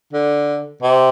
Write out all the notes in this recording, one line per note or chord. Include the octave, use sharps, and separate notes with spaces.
D3
C3